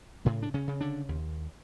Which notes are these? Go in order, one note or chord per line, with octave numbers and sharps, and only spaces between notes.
A2 C#3 A3
D4
C#3 C#4
C#3
D3 D4
D#2